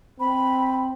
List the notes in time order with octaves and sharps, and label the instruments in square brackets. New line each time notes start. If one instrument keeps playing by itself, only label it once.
[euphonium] C4 [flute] B5